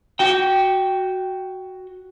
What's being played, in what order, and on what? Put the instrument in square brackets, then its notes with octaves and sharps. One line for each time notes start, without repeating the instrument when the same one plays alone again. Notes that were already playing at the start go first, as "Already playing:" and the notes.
[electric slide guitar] F#4 G5